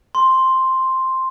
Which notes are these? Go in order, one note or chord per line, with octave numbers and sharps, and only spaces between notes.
C6